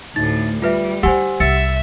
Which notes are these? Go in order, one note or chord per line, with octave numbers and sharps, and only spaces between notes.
D2 A2 D#4 A6
G3 F4 B4 E5
D#4 E4 G4 C5 F#5 G#5 E6
C2 E5 E6 A6 C#7